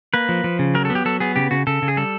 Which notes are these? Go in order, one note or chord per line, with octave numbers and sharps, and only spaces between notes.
A#3 B4
F3
F3
C#3
F#3 A#4
A4
B3
G4
F#3 A4
B3 G#4
C#3 G4
C#3 F#4
C#3 A4
C#3
G#4
G3 A4